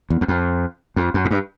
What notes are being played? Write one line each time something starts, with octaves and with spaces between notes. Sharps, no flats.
E2
E2
F2
F2
F#2
G#2
G2